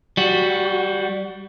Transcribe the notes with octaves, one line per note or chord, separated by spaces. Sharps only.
G3 F#4